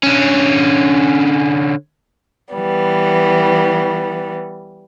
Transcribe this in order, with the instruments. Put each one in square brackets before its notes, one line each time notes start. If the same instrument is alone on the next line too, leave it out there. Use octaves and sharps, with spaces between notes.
[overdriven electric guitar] D3 C#4
[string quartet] E3 G3 B3